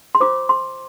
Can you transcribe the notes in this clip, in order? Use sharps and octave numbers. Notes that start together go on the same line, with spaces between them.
C6
F4 C5 D6
C6